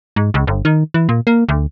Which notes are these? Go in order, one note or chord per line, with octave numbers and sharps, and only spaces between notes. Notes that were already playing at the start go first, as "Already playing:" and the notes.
G#2
C#2
G1
D#3
E3
A#2
A#3
D2